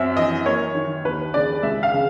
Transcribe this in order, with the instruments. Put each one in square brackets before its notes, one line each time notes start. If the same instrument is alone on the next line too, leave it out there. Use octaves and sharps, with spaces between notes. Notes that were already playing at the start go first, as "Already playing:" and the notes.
Already playing: [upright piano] F#2 C4 E5
E3 D#5
A#3 C#5
D#3
D#2 B4
C#3 D5
C#2 E5
F5
C#3